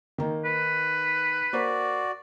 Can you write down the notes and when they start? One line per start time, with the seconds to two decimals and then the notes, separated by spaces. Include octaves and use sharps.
0.18 D#3 A#3 D#4
0.45 B4
1.53 A#3 F#4 C5 D5